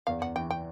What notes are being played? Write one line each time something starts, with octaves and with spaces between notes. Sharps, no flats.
E2 F5
E2 F#5
E3 G5
G5